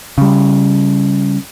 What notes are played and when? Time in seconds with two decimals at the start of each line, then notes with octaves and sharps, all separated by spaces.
0.18 C#3 G3